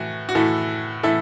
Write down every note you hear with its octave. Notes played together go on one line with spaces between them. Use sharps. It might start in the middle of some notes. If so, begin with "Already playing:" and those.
Already playing: A2 E3 F#4
F#4
A2 E3 E4 A4
A2 E3 E4 A4